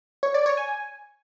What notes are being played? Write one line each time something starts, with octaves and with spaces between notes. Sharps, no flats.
C#5
D5
C#5
G#5